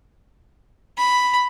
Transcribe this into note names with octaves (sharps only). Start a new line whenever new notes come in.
B5